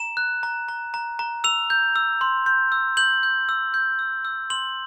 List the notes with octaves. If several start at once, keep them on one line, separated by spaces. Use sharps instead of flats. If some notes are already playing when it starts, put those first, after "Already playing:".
Already playing: A#5 E7
F#6
A#5
A#5
A#5
A#5
E6 F7
G6
E6
C6
G6
E6
G6 F#7
G6
E6
G6
E6
E6
C6 F#7